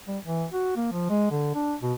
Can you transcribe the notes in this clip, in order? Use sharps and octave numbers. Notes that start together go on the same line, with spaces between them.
G3
E3
F#4
A#3
F3
G#3
D3
D4
B2